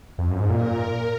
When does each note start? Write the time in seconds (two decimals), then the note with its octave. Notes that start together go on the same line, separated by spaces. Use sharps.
0.18 F2
0.29 F#2
0.39 G#2
0.50 A#2 A#4